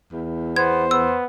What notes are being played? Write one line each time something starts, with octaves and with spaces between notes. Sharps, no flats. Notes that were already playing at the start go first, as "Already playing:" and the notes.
E2
B3 C5 G#6
B3 E6